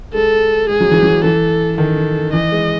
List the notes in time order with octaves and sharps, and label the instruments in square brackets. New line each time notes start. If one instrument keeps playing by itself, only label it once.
[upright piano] G#3 [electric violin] A4
[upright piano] G#3 [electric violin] G#4
[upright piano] F#3
E3
F#3
[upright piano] E3 [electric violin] A4
[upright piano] D#3 [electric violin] A4
[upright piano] E3 [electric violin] D#5
[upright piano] G#3